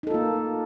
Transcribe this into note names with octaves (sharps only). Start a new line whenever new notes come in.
A#3 D#4 F4 A4